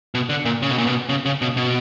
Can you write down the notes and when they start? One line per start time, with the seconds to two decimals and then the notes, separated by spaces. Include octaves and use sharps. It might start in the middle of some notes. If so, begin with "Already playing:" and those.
0.15 B2
0.29 D3
0.45 A#2
0.62 C#3
0.70 B2
0.78 A#2
0.87 B2
1.09 C#3
1.25 C#3
1.42 B2
1.57 B2